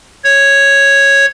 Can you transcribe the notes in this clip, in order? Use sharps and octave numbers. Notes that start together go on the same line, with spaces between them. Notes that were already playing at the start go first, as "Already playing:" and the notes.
C#5